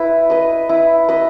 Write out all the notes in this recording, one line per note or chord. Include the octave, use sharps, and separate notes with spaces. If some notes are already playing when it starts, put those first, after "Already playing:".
Already playing: E4 B4
B4 D#5
E4
B4 D#5